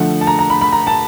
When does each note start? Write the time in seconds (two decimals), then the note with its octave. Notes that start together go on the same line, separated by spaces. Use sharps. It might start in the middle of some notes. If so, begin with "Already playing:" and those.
Already playing: D3 F3 A3 F#5
0.21 A5
0.27 A#5
0.39 A#5
0.50 B5
0.61 B5
0.72 A#5
0.87 A5